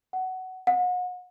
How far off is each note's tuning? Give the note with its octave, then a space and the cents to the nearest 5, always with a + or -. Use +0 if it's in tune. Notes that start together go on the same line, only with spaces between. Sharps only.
F#5 +15
F#5 -35